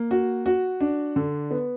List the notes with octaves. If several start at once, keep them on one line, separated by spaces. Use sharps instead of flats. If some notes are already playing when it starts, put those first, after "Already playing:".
Already playing: A#3
F#4
F#4
D4
D3
B3